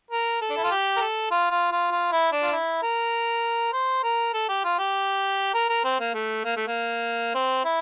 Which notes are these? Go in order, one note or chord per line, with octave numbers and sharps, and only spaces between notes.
A#4
A4
D4
E4
F4
G4
A#4
A4
F4
F4
F4
F4
E4
D4
F4
E4
A#4
C5
A#4
A4
G4
F4
G4
A#4
A#4
C4
A#3
A3
A#3
A3
A#3
C4
E4